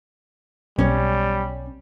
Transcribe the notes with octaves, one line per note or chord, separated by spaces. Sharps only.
B1 G3 C#4